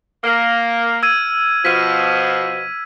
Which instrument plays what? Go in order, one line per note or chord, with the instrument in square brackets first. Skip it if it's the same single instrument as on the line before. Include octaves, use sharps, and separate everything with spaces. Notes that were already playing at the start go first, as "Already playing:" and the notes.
[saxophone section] A#3 [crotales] F6
[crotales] E6 G#6 D#7
[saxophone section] B2 F3 [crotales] B6 D#7